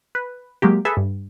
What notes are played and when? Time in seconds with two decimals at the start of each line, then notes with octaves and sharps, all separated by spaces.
0.15 B4
0.62 F#3 G#3 A#3 G4
0.85 G#4 A4 B4 E5
0.97 G2